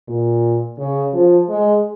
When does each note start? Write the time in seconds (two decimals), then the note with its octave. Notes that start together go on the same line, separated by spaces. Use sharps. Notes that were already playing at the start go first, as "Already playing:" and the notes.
0.08 A#2
0.78 C#3
1.13 F3
1.49 G#3